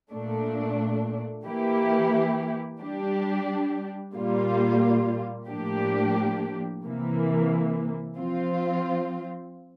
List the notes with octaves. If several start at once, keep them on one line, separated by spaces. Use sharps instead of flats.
A#2 A3 D4
E3 A#3 E4 G4
G3 D4 G4
A#2 G3 A#3 F4
A2 F3 A#3 D4 G4
C3 E3 A#3
F3 C4 F4